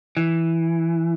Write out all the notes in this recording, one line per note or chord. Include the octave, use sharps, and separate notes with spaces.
E3